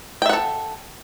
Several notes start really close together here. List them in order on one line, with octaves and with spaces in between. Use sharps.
G5 E5 F#5 A4